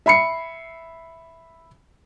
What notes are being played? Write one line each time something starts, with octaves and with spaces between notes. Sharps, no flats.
E5 B5 C7 C#7